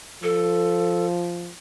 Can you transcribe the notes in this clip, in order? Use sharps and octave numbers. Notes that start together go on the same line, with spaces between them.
F3 A4